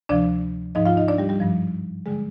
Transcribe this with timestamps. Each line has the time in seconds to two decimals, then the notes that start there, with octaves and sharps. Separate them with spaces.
0.09 D2 C3 F3 D4 D5
0.75 G#2 F3 D#4 D#5
0.85 F4 F5
0.97 D#4 D#5
1.08 D4 D5
1.18 G3 G4
1.29 G3 G4
1.40 G2 F3
2.06 D3 G3 G#3 G#4